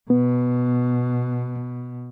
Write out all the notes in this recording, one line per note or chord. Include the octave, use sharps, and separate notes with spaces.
B2 B3